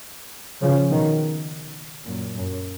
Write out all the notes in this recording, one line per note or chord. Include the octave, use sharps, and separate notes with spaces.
C#3 F3
B2 D#3
F#2 A#2
F#2